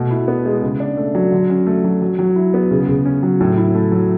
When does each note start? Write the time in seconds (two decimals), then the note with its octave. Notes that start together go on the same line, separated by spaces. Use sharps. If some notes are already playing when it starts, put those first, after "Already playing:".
Already playing: B2 A3
0.11 E4
0.28 B3
0.45 G#3
0.62 C#3
0.80 D4
0.97 A3
1.15 F#3
1.32 D3
1.50 C#4
1.67 A3
1.84 F#3
2.02 F#3
2.19 F#3
2.36 E4
2.54 B3
2.71 C#3
2.88 C#3
3.06 C#4
3.23 F#3
3.40 A2
3.57 E4
3.75 A3
3.92 F#3